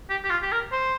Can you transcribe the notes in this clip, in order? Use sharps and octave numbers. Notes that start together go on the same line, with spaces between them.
G4
G4
F4
G4
A#4
C5